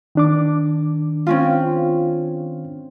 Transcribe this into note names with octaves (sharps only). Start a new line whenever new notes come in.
D#3 D4 D6
C4 C#4 F4